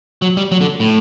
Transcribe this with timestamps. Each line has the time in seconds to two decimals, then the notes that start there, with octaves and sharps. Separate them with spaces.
0.22 F#3
0.37 G3
0.52 F#3
0.61 D3
0.80 A2